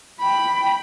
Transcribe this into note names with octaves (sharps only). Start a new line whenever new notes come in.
G5 B5